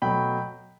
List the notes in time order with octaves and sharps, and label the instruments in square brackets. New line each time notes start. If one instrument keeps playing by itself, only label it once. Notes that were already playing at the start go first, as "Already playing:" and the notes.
[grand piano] B2 F#3 A3 G5 B5